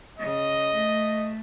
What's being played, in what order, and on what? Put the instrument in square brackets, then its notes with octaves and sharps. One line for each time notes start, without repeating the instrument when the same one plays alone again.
[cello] C#3 [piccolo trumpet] D#5
[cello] A3